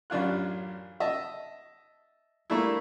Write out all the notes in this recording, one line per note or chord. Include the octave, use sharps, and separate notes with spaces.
A1 F#2 D4 F4 F#6
D#5 E5 A5
G3 A3 A#3 D4 E4